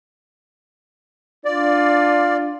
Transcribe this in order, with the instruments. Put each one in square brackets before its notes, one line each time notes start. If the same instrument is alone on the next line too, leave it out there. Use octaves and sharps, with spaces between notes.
[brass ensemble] D4 F4 [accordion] D5